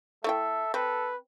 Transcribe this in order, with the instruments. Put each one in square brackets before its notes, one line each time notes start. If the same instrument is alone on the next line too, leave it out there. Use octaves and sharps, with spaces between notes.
[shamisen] A3 E4 G5 [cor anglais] A4 [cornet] E5
[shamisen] C4 [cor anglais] A4 [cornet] B4